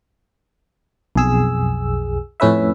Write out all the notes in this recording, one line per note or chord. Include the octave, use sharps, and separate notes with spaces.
B1 F2 G#4 E6
F2 A2 C#4 B4 E5